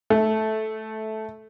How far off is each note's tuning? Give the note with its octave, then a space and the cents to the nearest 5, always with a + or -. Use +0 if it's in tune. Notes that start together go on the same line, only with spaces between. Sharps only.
A3 -15